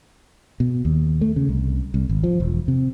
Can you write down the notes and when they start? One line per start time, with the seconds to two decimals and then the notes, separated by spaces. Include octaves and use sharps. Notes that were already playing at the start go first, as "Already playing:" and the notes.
0.60 B2
0.85 D#2
1.21 A3
1.36 C#3
1.49 C2
1.94 C2
2.09 G#1
2.23 F3
2.40 E1
2.68 C3